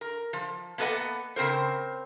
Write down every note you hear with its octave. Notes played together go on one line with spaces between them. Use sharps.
A#4
F3
A#3 B3 A4 B4 D#5 F#5
C#3 C4 A#4 C5